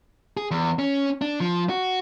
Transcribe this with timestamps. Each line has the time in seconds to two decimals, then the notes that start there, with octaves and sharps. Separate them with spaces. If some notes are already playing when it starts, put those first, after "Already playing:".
0.37 G#4
0.51 E2
0.79 C#4
1.22 D4
1.40 F3
1.69 F#4